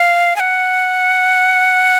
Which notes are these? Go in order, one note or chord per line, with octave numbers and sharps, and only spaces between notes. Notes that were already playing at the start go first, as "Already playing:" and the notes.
Already playing: F5
G#5
F#5